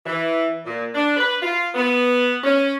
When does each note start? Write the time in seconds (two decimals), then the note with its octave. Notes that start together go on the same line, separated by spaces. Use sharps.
0.06 E3
0.65 A#2
0.95 D4
1.17 B4
1.42 F4
1.75 B3
2.43 C#4